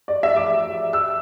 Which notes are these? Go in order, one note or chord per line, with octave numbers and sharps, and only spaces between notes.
D5
E5
D6
E6